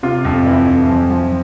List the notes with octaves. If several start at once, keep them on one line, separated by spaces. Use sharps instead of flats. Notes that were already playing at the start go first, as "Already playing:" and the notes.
C3 F4
F2
E3 E4
F2
F3
F3